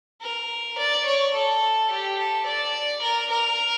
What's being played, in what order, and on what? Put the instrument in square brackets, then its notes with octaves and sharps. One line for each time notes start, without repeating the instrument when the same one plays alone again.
[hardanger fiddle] A#4
D5
C#5
A4
G4
A4
D5
A#4
A#4